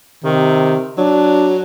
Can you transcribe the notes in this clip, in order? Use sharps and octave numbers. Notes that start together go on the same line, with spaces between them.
C3 D#3
F#3 D4